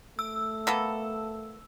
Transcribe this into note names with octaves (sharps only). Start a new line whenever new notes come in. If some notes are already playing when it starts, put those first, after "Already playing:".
A3 E6
A#3 B3 A4